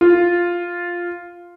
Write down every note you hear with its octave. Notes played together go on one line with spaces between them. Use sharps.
F4